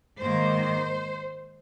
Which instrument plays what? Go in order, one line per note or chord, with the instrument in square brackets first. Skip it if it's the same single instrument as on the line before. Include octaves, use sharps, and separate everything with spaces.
[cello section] G#2 D#3 A#3 C5